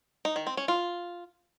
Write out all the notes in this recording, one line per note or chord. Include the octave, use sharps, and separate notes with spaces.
D#4
D#3
C4
C#4
F4